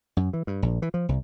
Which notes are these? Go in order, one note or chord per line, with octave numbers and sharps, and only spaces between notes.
F#2
E3
G2
A#1
E3
F3
C2